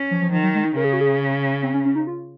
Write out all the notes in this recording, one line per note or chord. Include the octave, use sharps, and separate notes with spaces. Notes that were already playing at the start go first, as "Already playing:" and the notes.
Already playing: C#4
F3
F3
D#3 F3
F#3
G#3
D#4
C#3 A#4
G#4
F#4
G#4
C4
C#4
C#4
D#4
F4